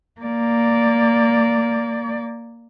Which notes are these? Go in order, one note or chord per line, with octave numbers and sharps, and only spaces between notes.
A#3 D5